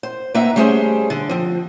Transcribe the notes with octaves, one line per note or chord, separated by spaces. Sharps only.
C5
A#3 C4 D#4 B4 E5 F#5
G3 A3 C#4 G#4 C5
D3
F3 C4